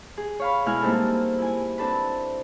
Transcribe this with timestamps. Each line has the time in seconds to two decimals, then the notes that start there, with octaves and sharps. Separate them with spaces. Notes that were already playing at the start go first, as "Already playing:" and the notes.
0.18 G#4
0.40 C#5 F5 B5
0.66 B2 G#3 E4 G#5 B5 F6
0.82 G3 A#3 C4 D#4 G#4 A4
1.38 E4 G#5
1.78 C4 D4 A4 B4